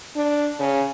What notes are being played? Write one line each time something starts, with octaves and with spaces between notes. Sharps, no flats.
D4
C#3